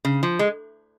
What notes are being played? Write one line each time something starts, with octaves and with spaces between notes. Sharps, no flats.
C#3
F3
G#3